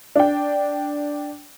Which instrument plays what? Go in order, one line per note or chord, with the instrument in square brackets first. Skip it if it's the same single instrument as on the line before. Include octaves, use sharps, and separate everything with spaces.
[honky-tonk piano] D4 G5